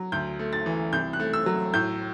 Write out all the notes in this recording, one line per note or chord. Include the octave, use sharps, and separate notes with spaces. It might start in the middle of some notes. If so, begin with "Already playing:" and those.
Already playing: F#3
D2 G6
A3
A6
E3
C2 G6
F#6
A3
E6
F#3
A2 G6